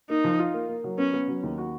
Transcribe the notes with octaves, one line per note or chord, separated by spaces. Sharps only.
A#3 D#4
F3
F4
A#3
A#3
F#3
B3 C#4
B3
F#3
D#2
F#4